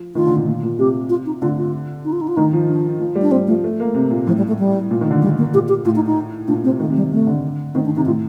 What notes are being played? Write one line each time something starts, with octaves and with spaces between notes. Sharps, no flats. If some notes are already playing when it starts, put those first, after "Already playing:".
Already playing: F3
D#3 F4
D3
A#2
A#2
A#2
C3 G4
F4
D#4
D3 F4
F4
D#4
F4
D#4
F4
D#3 D#4
F3
D4
F3
G3
D4
G3 C4
F3 A3
A3
A#3
C3
A#2
A2 F3
G3
A3
G3
A#2
D#3
D3
G3
A#3
A#2 G4
G4
A2 F4
D#4
D#4
A#2 D4
C3 C4
D#3 A3
C3
G3
C3 A3
D3
D#3 C4
D4
C3 D#4
A2 F4